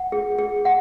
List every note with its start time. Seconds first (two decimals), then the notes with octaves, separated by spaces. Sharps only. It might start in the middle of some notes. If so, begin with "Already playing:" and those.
Already playing: F#5
0.12 G#4
0.39 G#4
0.65 F#5